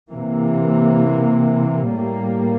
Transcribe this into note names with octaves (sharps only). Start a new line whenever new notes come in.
C3 E3 A#3
A2 G3 A#3